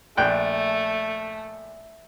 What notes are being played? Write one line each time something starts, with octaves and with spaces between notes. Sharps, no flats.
A#1 A3 G5 F#6